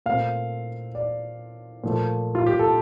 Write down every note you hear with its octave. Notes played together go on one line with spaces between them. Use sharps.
A#2 A3 C4 F5
D5
A#2 F3 A3
F4
G4
A4